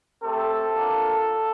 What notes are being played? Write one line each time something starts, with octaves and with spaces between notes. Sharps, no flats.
A3 C4 G4 A4
A#3 D4 F4